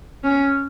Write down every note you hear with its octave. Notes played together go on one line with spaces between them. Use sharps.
C#4